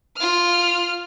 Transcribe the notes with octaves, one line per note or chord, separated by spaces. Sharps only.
F4 F6